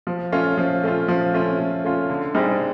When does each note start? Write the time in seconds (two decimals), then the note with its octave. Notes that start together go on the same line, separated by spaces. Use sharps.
0.07 F3
0.32 A3 C#4 F4
0.58 F3
0.83 A3 C#4 F4
1.08 F3
1.34 A3 C#4 F4
1.59 F3
1.84 A3 C#4 F4
2.10 D3
2.35 G3 C4 D#4 G#4